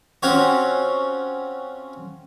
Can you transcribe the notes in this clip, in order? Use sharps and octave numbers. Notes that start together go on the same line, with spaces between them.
C4 C#4 F4 F#4 C5 C#5